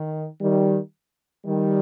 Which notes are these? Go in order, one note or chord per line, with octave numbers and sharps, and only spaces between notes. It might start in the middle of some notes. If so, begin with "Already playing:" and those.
Already playing: D#3
D#3 G3
D#3 G3